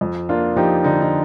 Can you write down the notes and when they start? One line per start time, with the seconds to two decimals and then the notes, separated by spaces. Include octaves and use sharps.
0.01 F2
0.29 A#3 D4 F4
0.56 F3 D#4 G4
0.84 D3 D#4
1.02 D#4